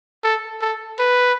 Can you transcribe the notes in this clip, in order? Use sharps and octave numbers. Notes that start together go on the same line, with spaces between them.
A4
A4
B4